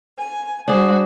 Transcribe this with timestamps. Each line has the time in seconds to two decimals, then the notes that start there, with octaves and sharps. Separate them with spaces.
0.18 G#5
0.68 G3 D4 F#4 G#4 C5